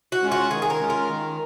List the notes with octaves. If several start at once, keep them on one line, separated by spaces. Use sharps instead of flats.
F#4
G#3 C#4 F4
F#4
D#3 G#4
G#4
A#4
G#3 C#4 F4
A#4
D#3